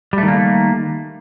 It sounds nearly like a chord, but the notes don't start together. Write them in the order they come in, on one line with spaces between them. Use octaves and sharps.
G3 A3 D#3 A#3